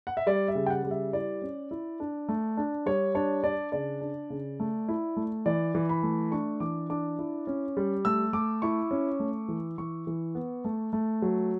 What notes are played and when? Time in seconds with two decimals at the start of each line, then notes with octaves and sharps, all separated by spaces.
0.07 F#5
0.17 E5
0.27 G3 D5
0.48 E5
0.55 C#3
0.66 G5
0.70 F#5
0.84 G3
0.91 E5
1.13 E4 D5
1.42 C#4
1.71 E4
2.00 D4
2.29 A3
2.57 D4
2.86 G3 C#5
3.15 D4 C#5
3.43 D4 D5
3.72 C#3 D5
4.01 D4
4.30 C#3
4.60 A3
4.89 E4
5.17 A3
5.46 E3 D5
5.75 E3
5.89 B5
6.03 A3
6.32 D4 C#6
6.60 E3 D6
6.90 D4 D6
7.19 E4
7.47 C#4
7.77 G3
8.05 A3 E6
8.33 A3 D6
8.62 E4 C#6
8.91 C#4
9.20 A3
9.49 E3
9.78 E3 C#6
10.07 E3
10.35 B3
10.65 A3
10.93 A3
11.22 F#3